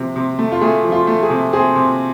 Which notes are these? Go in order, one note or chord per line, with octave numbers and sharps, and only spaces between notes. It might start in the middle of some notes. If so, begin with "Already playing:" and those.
Already playing: C3 F3
C3
A3
F4
A3 G#4
F3
F4
A3
G#4
C3
C4 G#4
C3